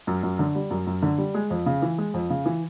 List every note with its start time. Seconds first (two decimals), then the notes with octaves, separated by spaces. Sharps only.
0.07 F#2
0.23 F#2
0.39 D3
0.55 G3
0.71 F#2
0.87 F#2
1.03 D3
1.18 G3
1.34 G#3
1.51 F2
1.66 C#3
1.82 E3
1.98 G#3
2.14 F2
2.30 C#3
2.46 E3